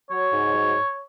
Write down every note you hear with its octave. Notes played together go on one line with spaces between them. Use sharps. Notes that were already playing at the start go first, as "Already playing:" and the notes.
F#3 C#5
G#2
F#3